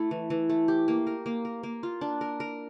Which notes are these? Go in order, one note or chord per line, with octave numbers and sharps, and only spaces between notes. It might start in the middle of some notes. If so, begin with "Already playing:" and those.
Already playing: A3 E4
E3
E3
A3
G4
A#3
A#4
A#3
A#4
A#3
F4
D4
A#4
A#4